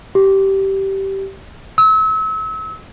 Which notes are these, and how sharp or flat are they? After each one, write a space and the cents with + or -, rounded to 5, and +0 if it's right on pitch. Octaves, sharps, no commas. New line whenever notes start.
G4 -15
E6 -35